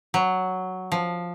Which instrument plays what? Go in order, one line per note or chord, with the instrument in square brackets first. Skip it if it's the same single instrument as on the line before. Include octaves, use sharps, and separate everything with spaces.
[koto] F#3
F3